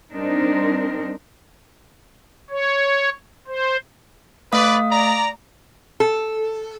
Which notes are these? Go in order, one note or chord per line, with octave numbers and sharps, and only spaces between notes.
G3 C4 D4 D#4 A#4 C5
C#5
C5
A3 B4 D5 F5 D#6
D5 A#5
A4